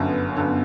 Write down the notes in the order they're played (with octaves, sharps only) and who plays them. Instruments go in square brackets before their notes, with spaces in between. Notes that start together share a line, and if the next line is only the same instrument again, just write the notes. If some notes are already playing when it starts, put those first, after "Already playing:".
Already playing: [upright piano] G1 F#2 D3 [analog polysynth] B3
[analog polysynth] C#4
[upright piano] G1 F#2 D3 [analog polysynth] B3